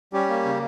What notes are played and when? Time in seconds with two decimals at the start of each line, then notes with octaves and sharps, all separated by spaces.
0.13 G3 C#4 G4
0.29 A#3
0.45 C#3